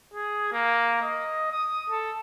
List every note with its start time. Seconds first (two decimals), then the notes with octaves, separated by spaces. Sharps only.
0.14 G#4
0.52 A#3
1.02 D#5
1.52 D#6
1.90 A4